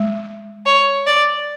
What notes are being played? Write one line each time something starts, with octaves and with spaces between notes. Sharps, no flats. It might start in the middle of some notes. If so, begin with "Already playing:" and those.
Already playing: G#3
C#5
D5